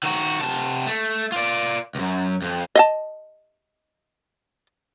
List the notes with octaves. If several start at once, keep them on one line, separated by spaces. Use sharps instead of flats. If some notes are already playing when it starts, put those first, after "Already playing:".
D#3 F#4
C3 A5
A3
F4 D5
C#2 F#2
F2
D#5 F5 A5